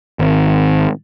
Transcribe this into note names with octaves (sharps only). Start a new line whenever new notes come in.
G#1